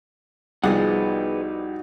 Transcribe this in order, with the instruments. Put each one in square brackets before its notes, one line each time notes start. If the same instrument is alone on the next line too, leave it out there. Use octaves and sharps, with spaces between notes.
[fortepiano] C2 F3 [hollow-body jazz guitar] B3 G#4 F#5 [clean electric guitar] D#4 F#4 D5